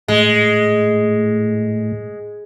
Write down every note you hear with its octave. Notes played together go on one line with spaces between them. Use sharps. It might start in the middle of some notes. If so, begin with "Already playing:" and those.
A2 G#3